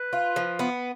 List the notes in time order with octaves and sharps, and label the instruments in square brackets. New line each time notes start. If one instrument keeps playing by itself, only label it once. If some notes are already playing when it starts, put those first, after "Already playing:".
Already playing: [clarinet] B4
[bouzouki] F4
F3
B3